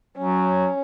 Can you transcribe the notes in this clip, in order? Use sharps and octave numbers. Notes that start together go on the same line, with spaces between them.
F#3 C#4